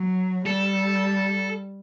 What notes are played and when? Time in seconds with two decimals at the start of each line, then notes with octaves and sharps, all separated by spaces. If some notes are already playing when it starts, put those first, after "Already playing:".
Already playing: F#3
0.46 G3 A4